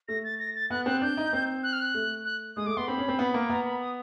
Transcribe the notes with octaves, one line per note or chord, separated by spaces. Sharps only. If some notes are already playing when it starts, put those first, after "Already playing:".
A3 A#6
A6
A#6
A6
B3 F#6
C4 F#6
D4 G6
D#4
C4
F#6
F6
F#6
A3
F#6
G#3 D#6
A3 D6
B3 C6
C4 B5
C#4
C4
B3
A#3
B3 A#5
B5
D#6